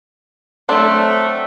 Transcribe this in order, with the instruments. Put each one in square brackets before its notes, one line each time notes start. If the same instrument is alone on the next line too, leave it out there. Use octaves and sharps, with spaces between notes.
[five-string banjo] F#3 C4 D4 [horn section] A3